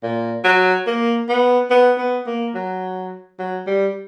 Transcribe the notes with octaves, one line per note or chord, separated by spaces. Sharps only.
A#2
F#3
A#3
B3
B3
B3
A#3
F#3
F#3
G3